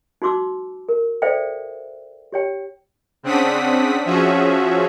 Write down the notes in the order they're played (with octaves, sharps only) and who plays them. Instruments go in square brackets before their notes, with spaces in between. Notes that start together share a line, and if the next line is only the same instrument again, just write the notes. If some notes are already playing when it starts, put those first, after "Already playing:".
[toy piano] D#4 F#4 C6 D6 E6
A#4
A4 C5 D5 E5 F5 G5
G4 C#5 G5
[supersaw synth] C#3 C4 D4 F#5 D#6 B6
F3 C#4 F#4 G#4 E5